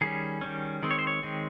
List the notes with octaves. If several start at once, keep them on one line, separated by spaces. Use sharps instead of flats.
D#3 G3 C#4 G#4
D#3 G3 C#4
D#3 G#3 C4
C#5
C5
C#5
D#3 G#3 C4